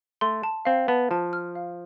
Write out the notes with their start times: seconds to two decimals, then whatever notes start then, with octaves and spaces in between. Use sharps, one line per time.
0.21 A3 C6
0.43 A5
0.65 C4 F5
0.88 B3 A5
1.11 F3 A5
1.33 F6
1.55 F5